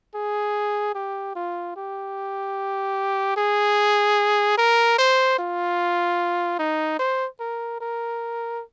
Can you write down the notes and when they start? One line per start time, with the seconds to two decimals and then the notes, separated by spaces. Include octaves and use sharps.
0.15 G#4
0.95 G4
1.35 F4
1.76 G4
3.37 G#4
4.58 A#4
4.98 C5
5.39 F4
6.59 D#4
6.99 C5
7.40 A#4
7.80 A#4